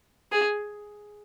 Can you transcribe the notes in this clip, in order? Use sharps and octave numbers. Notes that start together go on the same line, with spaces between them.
G#4